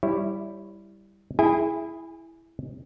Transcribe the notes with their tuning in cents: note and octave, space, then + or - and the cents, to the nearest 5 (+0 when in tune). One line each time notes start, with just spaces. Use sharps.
G3 +0 E4 +0 C#5 -20
E4 +0 G#4 +0 G#5 -40